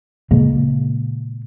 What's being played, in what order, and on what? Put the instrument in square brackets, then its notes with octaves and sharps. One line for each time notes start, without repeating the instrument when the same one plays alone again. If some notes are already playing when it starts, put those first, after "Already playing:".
[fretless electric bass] A#2 C#3 G#3 A#3